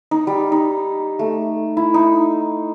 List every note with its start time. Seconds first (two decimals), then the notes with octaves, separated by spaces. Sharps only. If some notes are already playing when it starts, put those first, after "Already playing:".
0.11 D#4
0.27 G3
0.52 D#4
1.19 A3
1.77 E4
1.94 D#4